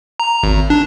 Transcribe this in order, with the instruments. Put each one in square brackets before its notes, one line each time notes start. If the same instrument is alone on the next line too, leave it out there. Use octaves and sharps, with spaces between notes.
[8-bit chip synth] A#5
G#1
D4